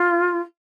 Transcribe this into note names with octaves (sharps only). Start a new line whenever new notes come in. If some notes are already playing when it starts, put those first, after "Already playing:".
Already playing: F4